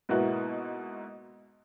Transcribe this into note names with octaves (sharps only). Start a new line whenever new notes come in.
G#2 B2 A#3 B3 E4 F#4